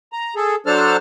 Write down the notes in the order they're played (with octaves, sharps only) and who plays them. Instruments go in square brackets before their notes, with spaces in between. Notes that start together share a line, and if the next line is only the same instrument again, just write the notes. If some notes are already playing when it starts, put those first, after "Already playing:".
[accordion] A#5
G#4 A4
F#3 D4 A4 C5 A5 F6